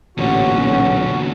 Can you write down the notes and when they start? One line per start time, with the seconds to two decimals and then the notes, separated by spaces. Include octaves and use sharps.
0.17 A1 E2 A#2 D3 C#4 F#4
0.56 B1